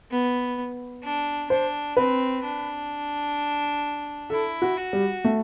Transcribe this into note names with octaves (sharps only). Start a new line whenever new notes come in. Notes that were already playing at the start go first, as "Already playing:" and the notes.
B3
D4
D4 C5
C4 B4
D4
E4 A4
F#4
F#4
G3
A3